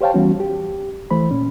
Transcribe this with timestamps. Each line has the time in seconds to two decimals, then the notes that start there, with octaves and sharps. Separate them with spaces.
0.01 G4 C5 C#5 F5 G5 A5
0.14 E3 G3 B3 C#4 F#4
0.40 G4
1.11 E3 A3 C5 B5
1.31 A#2 C#4